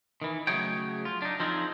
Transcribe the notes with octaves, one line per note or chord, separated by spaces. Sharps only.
D#3 E3
C#3 F#3 A3 G#4 C#5 G5
F4
D4 D#4
F3 C4 D#4 F4 G#4